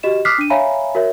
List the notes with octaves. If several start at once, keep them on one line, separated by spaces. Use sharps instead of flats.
F#4 G4 D#5 E7
D6 D#6 F6 F#6 B6 C7
D4 D#7
C#5 E5 F5 G#5 A#5 B5
F#4 A#4 C#5 E5